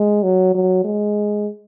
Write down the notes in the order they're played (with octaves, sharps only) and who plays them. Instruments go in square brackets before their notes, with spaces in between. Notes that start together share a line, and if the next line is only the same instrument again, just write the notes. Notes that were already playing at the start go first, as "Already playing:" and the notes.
Already playing: [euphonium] G#3
F#3
F#3
G#3